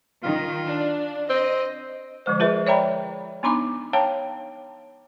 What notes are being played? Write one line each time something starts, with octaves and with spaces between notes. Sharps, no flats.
D#3 F4
D4
C4 D#5
D3 F3 G#3 C5
F4 G#4 A#4 B4 E5
C#5 D5 E5 G5 A#5 B5
B3 D4 D#4 A#5 B5 D6
C#5 F5 G5 A5 A#5